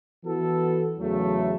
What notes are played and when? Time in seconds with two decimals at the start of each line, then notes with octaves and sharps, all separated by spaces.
0.23 E3 B3 F#4 A4
0.97 E2 C#3 F#3 A3